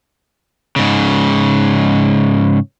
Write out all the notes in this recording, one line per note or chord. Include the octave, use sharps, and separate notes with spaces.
G#2 C#3